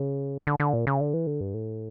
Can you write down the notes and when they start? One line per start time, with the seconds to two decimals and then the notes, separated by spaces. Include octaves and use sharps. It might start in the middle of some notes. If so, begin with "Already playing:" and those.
Already playing: C#3
0.47 D3
0.60 D3
0.73 A#2
0.87 C#3
1.00 D3
1.14 E3
1.27 D3
1.41 G2
1.54 A2